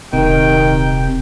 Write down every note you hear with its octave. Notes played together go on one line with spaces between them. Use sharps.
D#1 C3 D#3 G5